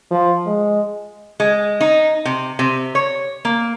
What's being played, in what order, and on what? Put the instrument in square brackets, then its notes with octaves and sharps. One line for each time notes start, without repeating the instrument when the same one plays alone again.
[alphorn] F3
G#3
[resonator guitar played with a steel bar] G#3
D#4
C3
C3
C#5
A#3